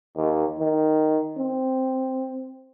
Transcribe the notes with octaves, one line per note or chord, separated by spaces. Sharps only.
D#2
D#3
C4